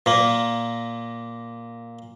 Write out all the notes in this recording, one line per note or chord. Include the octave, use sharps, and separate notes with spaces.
A#2 A#3